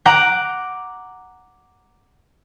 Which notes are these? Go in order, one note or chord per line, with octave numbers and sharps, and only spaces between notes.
F#5 A#5 D6 F#6 G6